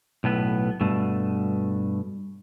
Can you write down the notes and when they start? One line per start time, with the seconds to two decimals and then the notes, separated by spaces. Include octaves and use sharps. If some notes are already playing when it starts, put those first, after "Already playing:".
0.24 B1 A2 B3
0.81 G2 B2 A3